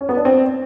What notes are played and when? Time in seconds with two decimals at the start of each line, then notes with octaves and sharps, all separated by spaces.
0.01 C#4
0.09 B3
0.17 D4
0.25 C4